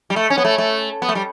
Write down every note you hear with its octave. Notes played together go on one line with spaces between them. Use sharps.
G3
A3
C#4
B3
A3
A3
B3
A3
G3